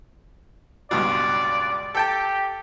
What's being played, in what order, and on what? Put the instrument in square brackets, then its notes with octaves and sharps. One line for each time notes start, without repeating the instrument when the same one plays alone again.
[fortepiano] C#2 G2 B2 [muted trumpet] D5
[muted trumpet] G4 [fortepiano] A4 G5 A5